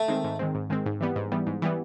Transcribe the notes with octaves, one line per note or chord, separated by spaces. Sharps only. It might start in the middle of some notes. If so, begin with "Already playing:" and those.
Already playing: A3
D#3 G#3 C4
G#2
D#3 G#3 C4
G#2
D#3 G#3 C4
G#2
E3 G3 B3
G#2
E3 G3 B3
G#2
E3 G3 B3